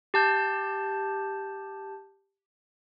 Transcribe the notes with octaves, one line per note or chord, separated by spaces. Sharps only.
G4 A5 G6